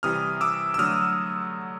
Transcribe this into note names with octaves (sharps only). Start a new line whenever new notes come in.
C3 E3 G3 D#6 F6
D6 E6
E6
D3 F#3 A3 D#6 F6